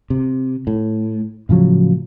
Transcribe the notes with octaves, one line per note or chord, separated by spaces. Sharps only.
C3
A2
A2 C#3 F3 F#3